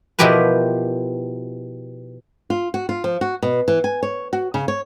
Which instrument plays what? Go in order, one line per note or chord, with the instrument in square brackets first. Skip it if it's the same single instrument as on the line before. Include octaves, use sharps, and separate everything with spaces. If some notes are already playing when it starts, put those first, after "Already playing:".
[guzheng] B2 F3 E4 G4 A#4 B4
[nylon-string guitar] F4
F#4
F4
F3
F#4
B2
E3
G#5
C#5
F#4
C#3
C#5